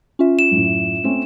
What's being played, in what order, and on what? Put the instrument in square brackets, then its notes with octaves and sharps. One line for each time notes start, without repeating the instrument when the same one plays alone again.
[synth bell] C#4 F4 E5
[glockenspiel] E7
[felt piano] F#2 A2
A3 C4 C#4